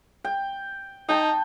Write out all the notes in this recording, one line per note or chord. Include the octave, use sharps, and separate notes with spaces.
G5
D#4 G5 A5